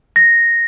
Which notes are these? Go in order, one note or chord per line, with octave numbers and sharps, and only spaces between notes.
A#6